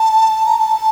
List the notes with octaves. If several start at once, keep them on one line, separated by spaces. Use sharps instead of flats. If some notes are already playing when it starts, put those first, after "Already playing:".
Already playing: A5
A#5
A5